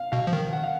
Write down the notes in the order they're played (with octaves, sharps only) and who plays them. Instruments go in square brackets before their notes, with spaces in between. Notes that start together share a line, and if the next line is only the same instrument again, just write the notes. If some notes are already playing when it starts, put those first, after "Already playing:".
Already playing: [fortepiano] F5
[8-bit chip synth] B2 [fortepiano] F5
[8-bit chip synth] F3
D#3
[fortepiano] F#5
F5